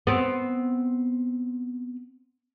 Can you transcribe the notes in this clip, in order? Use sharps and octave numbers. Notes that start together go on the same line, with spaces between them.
B3 C4